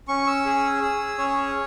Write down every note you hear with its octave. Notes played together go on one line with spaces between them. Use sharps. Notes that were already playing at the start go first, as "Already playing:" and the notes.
C#4 C#6
E6
G#4
G#4
C#4 C#5